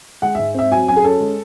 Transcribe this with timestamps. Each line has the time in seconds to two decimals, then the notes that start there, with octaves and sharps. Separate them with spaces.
0.22 G#3 F#5
0.35 G#2 E5
0.54 C4 E5
0.72 F#3 G#5
0.88 F#2 G#5
0.96 G#4
1.04 C#4 A4
1.20 G#3